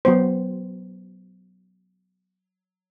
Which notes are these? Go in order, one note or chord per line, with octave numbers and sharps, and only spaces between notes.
F#3 B3 C5